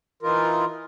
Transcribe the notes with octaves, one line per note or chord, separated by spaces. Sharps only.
E3 D#4 F4 A#4